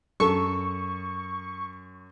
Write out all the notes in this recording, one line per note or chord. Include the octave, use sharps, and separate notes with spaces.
F#2 A4 C#6